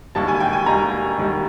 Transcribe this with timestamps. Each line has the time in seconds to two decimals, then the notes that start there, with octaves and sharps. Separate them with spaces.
0.15 E1 D#2 D#3 G3 A5
0.28 G#5
0.40 G5
0.53 G#5
0.66 E1 D#2 D#3 G3 A#5
1.17 E1 D#2 D#3 G3